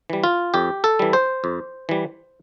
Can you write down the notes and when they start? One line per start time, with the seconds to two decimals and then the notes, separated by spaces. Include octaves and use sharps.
0.10 E3 G3
0.24 F4
0.54 F2 G4
0.84 A4
0.99 E3 G3
1.13 C5
1.44 F2
1.89 E3 G3